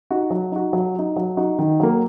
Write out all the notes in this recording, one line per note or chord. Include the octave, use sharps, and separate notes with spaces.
D#4 F#4
F#3
D#4 F#4
F#3
D#4 F#4
F#3
D#4 F#4
D#3
F#3 A#3